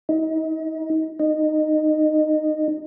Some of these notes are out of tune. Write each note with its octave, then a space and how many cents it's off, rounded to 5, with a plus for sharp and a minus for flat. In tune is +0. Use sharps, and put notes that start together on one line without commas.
D#4 +35
D#4 -15